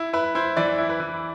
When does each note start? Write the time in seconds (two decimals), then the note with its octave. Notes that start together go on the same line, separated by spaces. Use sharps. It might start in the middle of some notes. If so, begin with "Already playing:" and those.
Already playing: E4
0.13 E4 B4
0.35 E4 C5
0.57 E3 D5
0.78 E4
0.89 B4
1.00 E3